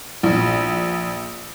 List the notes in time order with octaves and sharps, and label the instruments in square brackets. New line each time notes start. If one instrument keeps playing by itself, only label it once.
[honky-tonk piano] A#1